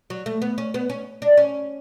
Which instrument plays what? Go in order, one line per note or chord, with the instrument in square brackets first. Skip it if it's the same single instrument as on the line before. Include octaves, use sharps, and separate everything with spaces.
[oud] F#3
A3
B3
C#4
B3
C#4
D4
C#4